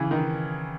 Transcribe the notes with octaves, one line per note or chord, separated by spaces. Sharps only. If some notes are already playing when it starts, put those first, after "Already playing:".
Already playing: C#3 E3
D#3